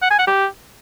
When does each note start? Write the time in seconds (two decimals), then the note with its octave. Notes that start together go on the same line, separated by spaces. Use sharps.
0.02 F#5
0.10 G#5
0.19 F#5
0.27 G4